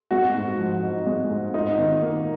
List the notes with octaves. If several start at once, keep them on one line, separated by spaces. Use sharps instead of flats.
G#3 F#4
G#2
F3
D#4
G#3
G#2
D#4 F4
D#3
A#3